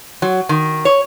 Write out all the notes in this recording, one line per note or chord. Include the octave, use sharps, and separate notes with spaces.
F#3
D#3
C#5